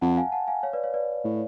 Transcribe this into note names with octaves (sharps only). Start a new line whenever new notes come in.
F2 F#5 A5
F5 G#5
F#5 A5
F5 G#5
C#5 F5
B4 D5
C#5 F5
B4 D5
A2